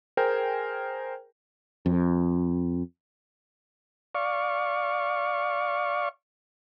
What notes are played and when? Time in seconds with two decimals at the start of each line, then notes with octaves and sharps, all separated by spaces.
0.17 G#4 A#4 C5 G5 G#5
1.86 F2
4.15 D5 F5 C#6